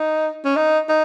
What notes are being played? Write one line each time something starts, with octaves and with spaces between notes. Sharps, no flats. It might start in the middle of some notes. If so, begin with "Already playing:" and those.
Already playing: D#4
C#4
D#4
D#4